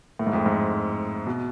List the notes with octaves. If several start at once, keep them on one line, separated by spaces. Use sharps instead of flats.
A2
G#2
F2
G#2
B2